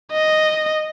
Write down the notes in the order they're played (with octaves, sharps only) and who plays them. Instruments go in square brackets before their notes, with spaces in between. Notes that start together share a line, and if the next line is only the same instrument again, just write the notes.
[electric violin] D#5